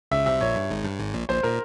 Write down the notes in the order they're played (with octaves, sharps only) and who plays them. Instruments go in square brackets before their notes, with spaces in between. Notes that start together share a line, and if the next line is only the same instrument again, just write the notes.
[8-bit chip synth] C#2 C#3 [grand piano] E5
[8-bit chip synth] C2 C3 [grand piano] E5
[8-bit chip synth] A#1 A#2 [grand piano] C#5
[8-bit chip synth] G2
G#1 G#2
G2
G#1 G#2
A#1 A#2
[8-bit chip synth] A#1 A#2 [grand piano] C5
[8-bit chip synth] A#2 [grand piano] A#4